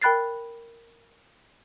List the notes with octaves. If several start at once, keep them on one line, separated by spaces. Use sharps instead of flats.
A#4 G5 B5 F#6 A6 C7